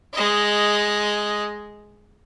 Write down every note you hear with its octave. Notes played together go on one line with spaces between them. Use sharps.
G#3 D#5